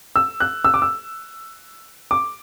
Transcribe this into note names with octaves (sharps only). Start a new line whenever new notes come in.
E6
F#6
E6
D6
E6
D6